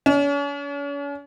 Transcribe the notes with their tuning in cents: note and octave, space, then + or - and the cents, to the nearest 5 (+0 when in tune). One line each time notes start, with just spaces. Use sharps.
C#4 +40